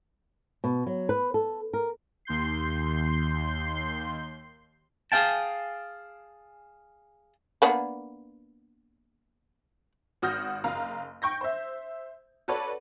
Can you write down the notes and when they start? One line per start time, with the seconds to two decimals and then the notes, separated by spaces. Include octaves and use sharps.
0.64 B2
0.87 F#3
1.09 B4
1.34 A4
1.73 A#4
2.25 D#2 C6 G6 C7
5.12 G#4 B4 F5 G5 A5
7.62 A#3 B3 D4
10.22 G#1 F#4 D#6 F6 G6 A#6
10.64 F#1 F5 A#5
11.22 G5 C#6 G6 A#6
11.41 C5 E5
12.48 F#4 A4 B4 C#5 D5